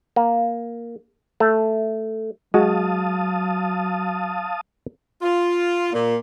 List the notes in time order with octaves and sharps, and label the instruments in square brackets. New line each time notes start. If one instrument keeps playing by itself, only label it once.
[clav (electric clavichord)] A#3
A3
[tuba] F#3 [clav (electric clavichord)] G#3 F#4 [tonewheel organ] F5 A5 D#6
[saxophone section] F4
A#2